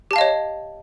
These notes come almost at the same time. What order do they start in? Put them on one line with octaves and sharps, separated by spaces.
G4 A5 F5 D#5 C#5